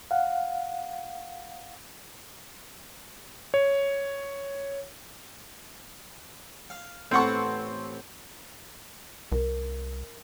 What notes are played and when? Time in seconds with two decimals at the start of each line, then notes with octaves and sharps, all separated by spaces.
0.11 F5 F#5
3.54 C#5
6.70 F5
7.11 A1 B3 C4 A4 F#5 C#6
9.32 C2 A#4